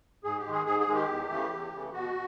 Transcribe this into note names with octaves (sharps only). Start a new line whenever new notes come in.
G#2 G#4
G4
D#3 G#3
G#4
G#2 G#4
G#4
D#3 G#3
G4
E2
C#3 E3 A3
E2
C#3 E3 A3
B2 F#4